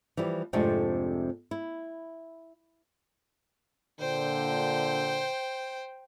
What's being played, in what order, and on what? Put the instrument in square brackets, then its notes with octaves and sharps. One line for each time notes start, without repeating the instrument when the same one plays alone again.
[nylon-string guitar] E3 F3 G3 G4
F2 G#2 C3 A3 C4 D4
E4
[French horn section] A#2 D3 [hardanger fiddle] C5 G5